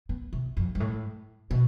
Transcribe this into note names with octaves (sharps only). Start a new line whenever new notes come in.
B3
C3
F2
G2
A2
B2